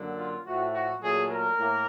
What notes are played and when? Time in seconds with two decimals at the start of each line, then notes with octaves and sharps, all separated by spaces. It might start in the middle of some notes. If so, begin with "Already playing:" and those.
Already playing: F#2 D3 F#3 A#3
0.16 F4
0.44 A2 F3 A3 F#4
0.73 F#4
1.00 A#2 F#3 A3 G#4
1.30 A#4
1.57 A2 A#3